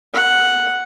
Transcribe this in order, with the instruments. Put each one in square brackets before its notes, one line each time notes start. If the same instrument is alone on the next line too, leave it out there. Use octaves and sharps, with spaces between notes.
[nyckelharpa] F#5